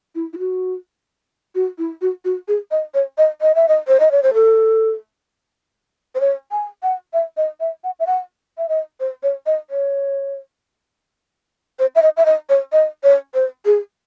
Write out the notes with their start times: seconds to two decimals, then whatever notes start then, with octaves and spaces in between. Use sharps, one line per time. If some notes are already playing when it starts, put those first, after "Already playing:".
0.15 E4
0.33 E4
0.38 F#4
1.55 F#4
1.78 E4
2.01 F#4
2.25 F#4
2.48 G#4
2.71 D#5
2.94 C#5
3.18 D#5
3.41 D#5
3.55 E5
3.68 D#5
3.88 C5
4.00 D#5
4.11 C#5
4.23 C5
4.34 A4
6.15 C5
6.20 C#5
6.51 G#5
6.83 F#5
7.13 E5
7.37 D#5
7.60 E5
7.84 F#5
7.99 E5
8.06 F#5
8.58 E5
8.69 D#5
9.00 C5
9.23 C#5
9.46 D#5
9.70 C#5
11.79 C5
11.95 E5
12.02 D#5
12.17 E5
12.26 D#5
12.49 C#5
12.72 D#5
13.03 C#5
13.34 C5
13.65 G#4